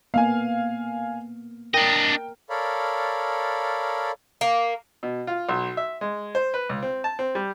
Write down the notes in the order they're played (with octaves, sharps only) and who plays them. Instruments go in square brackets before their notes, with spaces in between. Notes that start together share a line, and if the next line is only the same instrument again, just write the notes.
[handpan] A#3 B3 [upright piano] F5 G#5
[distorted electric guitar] D4 D#5 [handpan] A#4 [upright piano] G5
[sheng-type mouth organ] A4 A#4 C#5 D5 F5 B5
[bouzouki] A#3
[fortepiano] B2
F4
B1
E5
G#3
C5
B4
C#2
C4
A5
C4
G3